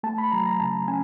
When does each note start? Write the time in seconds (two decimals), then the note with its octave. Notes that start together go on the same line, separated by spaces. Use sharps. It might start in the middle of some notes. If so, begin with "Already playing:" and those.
0.03 A3 A5
0.18 B5
0.32 F#3 A#5
0.46 A#5
0.60 C#3 A5
0.88 C#4 G#5